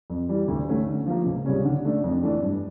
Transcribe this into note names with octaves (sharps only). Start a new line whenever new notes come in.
F2
E3 G3
D2
D3 A3 C#4
D3
F3 A#3
C#2
C#3 G3 C#4
D3
A3 D4
F2
E3 A3 D4
G2